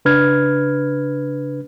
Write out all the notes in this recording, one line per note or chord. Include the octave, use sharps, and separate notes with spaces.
C#3 D4 B4 F6 G#6